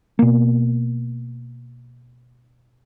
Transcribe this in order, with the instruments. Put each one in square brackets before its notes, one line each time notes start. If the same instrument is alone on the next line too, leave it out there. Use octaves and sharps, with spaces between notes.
[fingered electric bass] B2 A#3